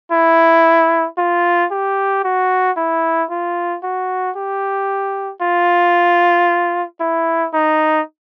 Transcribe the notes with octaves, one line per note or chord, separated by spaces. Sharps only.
E4
F4
G4
F#4
E4
F4
F#4
G4
F4
E4
D#4